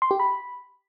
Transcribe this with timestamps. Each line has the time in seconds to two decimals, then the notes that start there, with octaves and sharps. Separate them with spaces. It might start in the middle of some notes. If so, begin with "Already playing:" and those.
0.02 C6
0.11 G4
0.20 B5